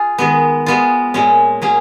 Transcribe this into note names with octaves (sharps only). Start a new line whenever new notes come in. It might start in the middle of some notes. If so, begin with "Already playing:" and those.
Already playing: F4 G#4
D#3 G#3 B3
G#3 B3 F4
A#2 G#3 C#4
F#3 A#3 C#4 G#4